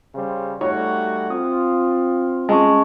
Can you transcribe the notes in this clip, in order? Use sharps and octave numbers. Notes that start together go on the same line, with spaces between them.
C#3 G3 C5
G3 A3 D#4 F#4 C#5
C4 F4 D#6
G#3 C#4 A5 C#6